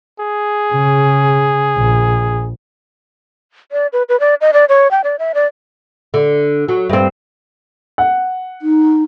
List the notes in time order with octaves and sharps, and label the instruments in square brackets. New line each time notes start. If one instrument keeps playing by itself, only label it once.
[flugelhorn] G#4
[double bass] C#3
A#1
[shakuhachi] D5
B4
B4
D5
D#5
D5
C#5
G5
D5
E5
D5
[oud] D3
F#3
G2 C4
[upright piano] F#5
[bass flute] D#4